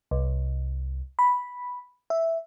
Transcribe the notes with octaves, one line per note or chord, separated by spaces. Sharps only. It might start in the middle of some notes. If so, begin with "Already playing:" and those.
C2
B5
E5